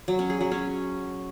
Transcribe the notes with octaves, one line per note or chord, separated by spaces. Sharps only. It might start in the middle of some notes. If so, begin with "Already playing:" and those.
F#3
C#4
G#4
F#3
C#4